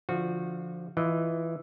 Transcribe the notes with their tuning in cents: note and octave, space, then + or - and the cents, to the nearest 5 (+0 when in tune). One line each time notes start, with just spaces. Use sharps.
D3 +0 F3 -10 F#4 -25
E3 +0 F4 -20 D#5 +0